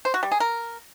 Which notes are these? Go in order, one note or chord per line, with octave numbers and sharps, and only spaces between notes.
C5
F#4
G3
G#4
A#4